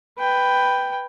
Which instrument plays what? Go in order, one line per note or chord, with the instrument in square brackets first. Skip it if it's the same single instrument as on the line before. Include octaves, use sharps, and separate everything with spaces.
[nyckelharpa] B4 G5